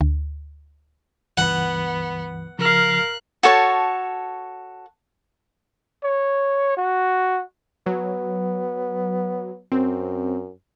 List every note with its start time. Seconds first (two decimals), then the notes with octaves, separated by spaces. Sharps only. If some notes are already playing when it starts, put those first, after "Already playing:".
0.01 D2
1.37 C#2 G2 E3 B3 F#5
2.59 C#3 F3 A#4 F5 F#6
3.43 F#4 A4 C#5 A5
6.04 C#5
6.77 F#4
7.86 F#3 B3
9.72 F#2 C4